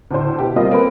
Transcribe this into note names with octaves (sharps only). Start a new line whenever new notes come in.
D2 A2 C5
B2 G4
G3 A#3 C4 F4 D#5
A#3 C4 A4 B4